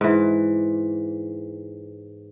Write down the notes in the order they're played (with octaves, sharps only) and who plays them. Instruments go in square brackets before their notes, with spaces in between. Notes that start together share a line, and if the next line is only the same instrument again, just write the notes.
[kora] G#2 E3